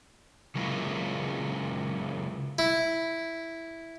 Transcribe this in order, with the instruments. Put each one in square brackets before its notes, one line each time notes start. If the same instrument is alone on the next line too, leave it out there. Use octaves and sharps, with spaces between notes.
[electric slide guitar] C#3 F#3 G#3 A#3 E4 F4
[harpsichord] E4